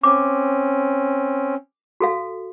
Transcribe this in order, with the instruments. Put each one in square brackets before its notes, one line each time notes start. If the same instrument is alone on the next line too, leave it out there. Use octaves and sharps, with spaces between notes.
[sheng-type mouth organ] C4 C#4 [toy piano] D6
[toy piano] F#4 A4 F5